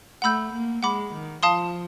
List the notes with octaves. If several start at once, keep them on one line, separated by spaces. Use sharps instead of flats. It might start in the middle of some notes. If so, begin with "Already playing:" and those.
A3 F#5 B5 E6 G6
A#3
G#3 F#5 B5 D6
D#3
F3 F5 A5 C6 D#6